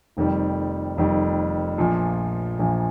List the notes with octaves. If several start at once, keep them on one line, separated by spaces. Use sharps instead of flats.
F1 F2 D#3 G3
F1 F2 D#3 G3
A#1 A#2 F3
A#1 A#2 F3